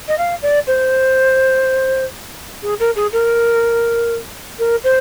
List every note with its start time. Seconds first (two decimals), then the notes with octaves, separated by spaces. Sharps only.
0.08 D#5
0.18 F5
0.42 D5
0.67 C5
2.63 G#4
2.80 A#4
2.96 G#4
3.12 A#4
4.59 A#4
4.84 C5